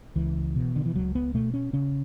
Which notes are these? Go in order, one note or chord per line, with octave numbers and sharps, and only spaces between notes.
C#2 E3
B2
D3
E3
C#2 F#3
B3
B2 A3
C#4
C#3 C#4